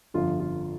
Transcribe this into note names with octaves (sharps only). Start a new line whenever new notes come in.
G1 F2 D3 F3 F4
F4